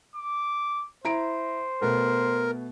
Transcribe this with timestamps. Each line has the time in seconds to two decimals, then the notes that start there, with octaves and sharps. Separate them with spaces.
0.16 D6
1.05 E4 C5 A#5 D7
1.82 B2 A3 B3 A#4